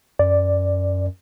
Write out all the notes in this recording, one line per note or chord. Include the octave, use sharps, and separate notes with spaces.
F#2 D5